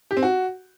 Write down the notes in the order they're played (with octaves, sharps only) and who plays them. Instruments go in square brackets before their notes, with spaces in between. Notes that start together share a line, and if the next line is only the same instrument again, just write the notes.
[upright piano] G4
C4
F#4